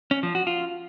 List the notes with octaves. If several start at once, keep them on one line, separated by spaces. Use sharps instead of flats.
C#4
F3
F#4
F4